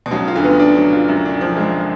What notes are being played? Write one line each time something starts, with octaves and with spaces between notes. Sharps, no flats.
B2
C#2 C#3 F#3
F4
D2 D3
B3
D4
F#3
F4
F#2
D4
F3
G#3